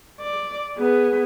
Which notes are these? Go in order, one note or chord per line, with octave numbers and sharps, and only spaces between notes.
D5
B3 G#4